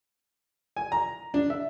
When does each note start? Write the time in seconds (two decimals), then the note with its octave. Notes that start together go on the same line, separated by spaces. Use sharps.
0.77 G#5
0.92 A#5
1.34 D4
1.50 E5